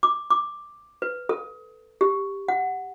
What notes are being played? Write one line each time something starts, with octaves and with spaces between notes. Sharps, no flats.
D6
D6
B4
A4
G4
F#5